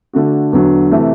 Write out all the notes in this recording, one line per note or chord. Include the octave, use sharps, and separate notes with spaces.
D3 A3 D4 F#4
E2 D3 F#3
C3 E3 A3